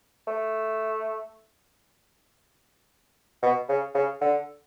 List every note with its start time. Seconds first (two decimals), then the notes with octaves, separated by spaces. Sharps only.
0.27 A3
3.43 B2
3.69 C#3
3.95 C#3
4.21 D3